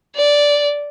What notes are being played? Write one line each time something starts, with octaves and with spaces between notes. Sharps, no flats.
D5